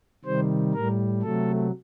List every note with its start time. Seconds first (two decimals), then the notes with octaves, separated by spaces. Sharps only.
0.25 C3 D#3 G3 C5
0.73 A2 G3 A#4
1.22 C3 F#3 A3 A4